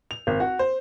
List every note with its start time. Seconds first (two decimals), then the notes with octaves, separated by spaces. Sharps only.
0.11 F7
0.27 G#1
0.40 F#4
0.59 C5